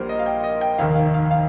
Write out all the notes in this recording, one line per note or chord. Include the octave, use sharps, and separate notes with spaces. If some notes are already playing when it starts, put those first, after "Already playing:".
Already playing: A#1 A#2 G3 A#4 C5
D#5
F5
G5
D#5
G5
F1 D#2 D#3 F5
F5
F5
F5